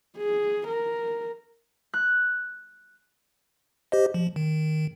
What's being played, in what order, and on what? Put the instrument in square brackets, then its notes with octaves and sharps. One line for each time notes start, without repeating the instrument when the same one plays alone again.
[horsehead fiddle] G#4
A#4
[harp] F#6
[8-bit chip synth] G4 C5 D#5
F3
D#3